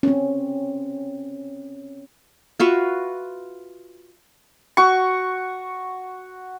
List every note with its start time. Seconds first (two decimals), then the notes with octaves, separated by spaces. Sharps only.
0.03 C4 C#4
2.60 F4 F#4 B4 E5
4.77 F#4 C#6